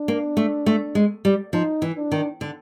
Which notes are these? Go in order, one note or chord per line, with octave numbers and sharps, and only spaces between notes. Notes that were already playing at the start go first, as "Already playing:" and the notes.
Already playing: D4
A#3
A3
A3
G#3
G3
F3 D#4
E3
D4
D#3
D3